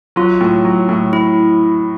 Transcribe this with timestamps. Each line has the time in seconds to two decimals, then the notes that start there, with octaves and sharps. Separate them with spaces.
0.16 F#3 F4
0.41 A2
0.65 F#3
0.89 A2
1.13 E4